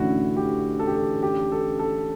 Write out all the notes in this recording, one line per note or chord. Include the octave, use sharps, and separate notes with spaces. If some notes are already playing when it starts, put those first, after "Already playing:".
Already playing: A1 D3 A3 C#4 E4 F#4
G4
A4
G4
A4
G4
A4
A4